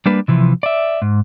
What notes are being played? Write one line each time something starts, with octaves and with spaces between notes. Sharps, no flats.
G3 A#3 D4 B4
C3 E3 F3
D5 E5
G#2